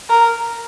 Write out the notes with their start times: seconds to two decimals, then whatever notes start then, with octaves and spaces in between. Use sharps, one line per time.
0.10 A#4